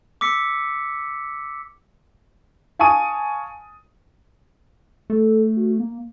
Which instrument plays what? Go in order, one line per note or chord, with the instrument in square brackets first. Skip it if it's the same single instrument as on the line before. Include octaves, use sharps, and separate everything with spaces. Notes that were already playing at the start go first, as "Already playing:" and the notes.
[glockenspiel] D6 E6 B6 C#7
[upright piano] F5 G#5 A5 C#6 D#6 D#7
[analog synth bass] A3 [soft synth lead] A4
[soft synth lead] F#4
A#3